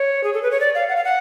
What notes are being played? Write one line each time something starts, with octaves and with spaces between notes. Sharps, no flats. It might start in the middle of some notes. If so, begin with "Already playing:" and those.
Already playing: C#5
G#4
A4
B4
C#5
D5
F5
F#5
F5
F#5